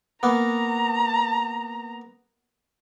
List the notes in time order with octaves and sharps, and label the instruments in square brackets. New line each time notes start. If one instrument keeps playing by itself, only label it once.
[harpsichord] A#3 B3 [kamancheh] A#5